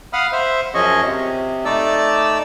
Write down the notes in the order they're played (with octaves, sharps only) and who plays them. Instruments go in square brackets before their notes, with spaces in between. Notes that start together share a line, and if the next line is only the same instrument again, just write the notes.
[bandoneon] F5 F#5 B5 D#6 F6
C5 E5
F#2 F3 C#4 G#4 D#5 C#6
C3
A3 D#4 D5 A5 E6